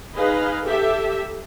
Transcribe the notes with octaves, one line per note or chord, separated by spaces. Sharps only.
D#4 G#4 B4 D#5 F5
G4 A4 E5